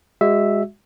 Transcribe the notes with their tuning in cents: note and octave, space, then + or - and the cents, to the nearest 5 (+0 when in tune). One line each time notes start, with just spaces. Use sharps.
G#3 -20 F#4 +0 E5 +0